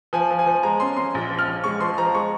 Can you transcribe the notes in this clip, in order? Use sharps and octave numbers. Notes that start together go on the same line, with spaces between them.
F3 G#5
F3
G#5
F3
G#3 A#5
C#4 C6
C#4 C6
A#1
F3
F6
A#1
G#3 C#6
F3 C6
F3 A#5
G#3 C#6